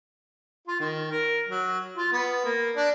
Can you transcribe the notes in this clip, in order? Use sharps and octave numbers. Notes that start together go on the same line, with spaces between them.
F4
D#3
A#4
F#3
F4
B3
A#3
D4